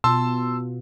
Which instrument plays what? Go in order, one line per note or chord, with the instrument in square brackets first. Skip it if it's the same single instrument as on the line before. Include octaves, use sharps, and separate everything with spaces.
[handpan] B2 F4 [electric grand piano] A5 C6 E6